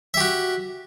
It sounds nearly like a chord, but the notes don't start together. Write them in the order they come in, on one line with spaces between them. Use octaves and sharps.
E5 G4 F#4